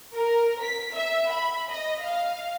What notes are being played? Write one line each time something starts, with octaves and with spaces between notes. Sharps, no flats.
A#4
B6
E5
B5
D#5
F5